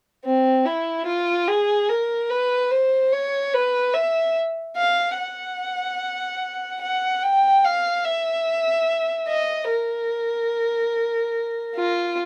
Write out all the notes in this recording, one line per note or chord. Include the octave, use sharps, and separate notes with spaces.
C4
E4
F4
G#4
A#4
B4
C5
C#5
B4
E5
F5
F#5
F#5
G5
F5
E5
D#5
A#4
F4